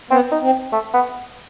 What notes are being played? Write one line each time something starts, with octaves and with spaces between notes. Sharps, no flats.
B3 C4
D#4
C4
A3
B3